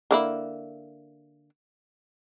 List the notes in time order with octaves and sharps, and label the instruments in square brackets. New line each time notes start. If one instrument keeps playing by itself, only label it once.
[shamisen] D3 A#3 E4